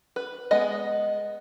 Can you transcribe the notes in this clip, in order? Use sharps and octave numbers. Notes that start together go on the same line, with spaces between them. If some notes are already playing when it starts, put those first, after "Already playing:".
B4
G#3 B3 D#5